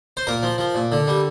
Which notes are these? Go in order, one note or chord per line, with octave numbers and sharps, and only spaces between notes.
C5
A#2 A#4
F3
F3
A#2
D3
G3